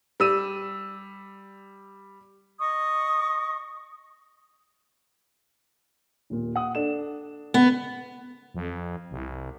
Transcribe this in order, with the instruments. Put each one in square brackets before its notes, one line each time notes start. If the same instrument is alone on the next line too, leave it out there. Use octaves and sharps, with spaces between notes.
[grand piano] G3 E6 D#7
[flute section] D#5 C#6 D#6
[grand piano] D#1 A#2
F#5 D#6
D4 A4 E7
[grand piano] C#3 [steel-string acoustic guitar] B3
[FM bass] F2
C2